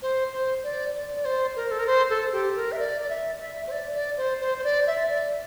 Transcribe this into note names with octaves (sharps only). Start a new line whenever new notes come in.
C5
C5
D5
D5
D5
C5
A#4
A4
A#4
C5
A4
G4
A#4
E5
D5
D5
E5
E5
C5
D5
D5
C5
C5
C5
D5
E5
D5